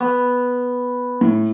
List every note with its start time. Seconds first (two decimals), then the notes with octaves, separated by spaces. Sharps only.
0.01 B3
1.21 A2